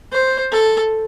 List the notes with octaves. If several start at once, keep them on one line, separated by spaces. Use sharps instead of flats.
C5
A4